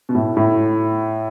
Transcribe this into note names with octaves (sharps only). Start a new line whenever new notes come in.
B2
A2
A2